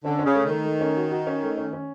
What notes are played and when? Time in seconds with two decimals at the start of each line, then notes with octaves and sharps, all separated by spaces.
0.04 D3 C#4
0.19 C#4
0.25 C#3
0.35 A3
0.45 D#3 A3
0.65 A3
0.81 C#4
0.97 F#4
1.11 F#4
1.27 C#4
1.42 A3
1.57 C#4
1.73 C#4